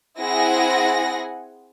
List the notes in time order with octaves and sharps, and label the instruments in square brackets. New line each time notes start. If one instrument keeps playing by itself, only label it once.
[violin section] C4 E4 G#4 F#5 G#5 A#6